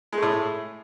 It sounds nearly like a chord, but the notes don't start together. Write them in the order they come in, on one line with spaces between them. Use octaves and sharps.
G#3 A3 A2